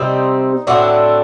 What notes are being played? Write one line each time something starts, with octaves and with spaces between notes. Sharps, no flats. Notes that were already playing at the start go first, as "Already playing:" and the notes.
Already playing: C3 G3 C4 D#4
A2 A3 C4 D4 F#4